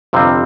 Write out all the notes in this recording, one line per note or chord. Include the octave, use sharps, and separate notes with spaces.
G1 F2 C3 G3 C4